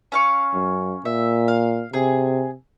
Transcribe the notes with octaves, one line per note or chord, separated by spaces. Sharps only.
C#4 F5 C#6
F#2
A#2 E5
F5
C3 G#4